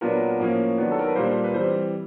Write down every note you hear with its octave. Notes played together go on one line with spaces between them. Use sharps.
A#2 F#3 B3 D4 A#4
A2 F3 A#3 C#4
D#3 F#3 B3 D4
A4
A#4
B4
A#2 G3 A#3 D4 C5
B4
E3 G3 C4 C5